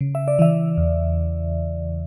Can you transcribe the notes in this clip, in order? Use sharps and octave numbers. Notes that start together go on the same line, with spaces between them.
C#3
E5
D5
E3 E5
E2